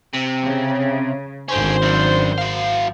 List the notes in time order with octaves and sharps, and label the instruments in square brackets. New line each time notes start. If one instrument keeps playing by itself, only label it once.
[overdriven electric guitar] C3
[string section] C#3
[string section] G#1 C5 [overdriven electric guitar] D3 C#4
[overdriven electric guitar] F#2 D4
F#3 F5